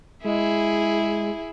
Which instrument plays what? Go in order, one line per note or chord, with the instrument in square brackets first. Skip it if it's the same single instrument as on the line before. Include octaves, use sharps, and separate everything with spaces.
[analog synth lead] G#3 [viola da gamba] E4 G#4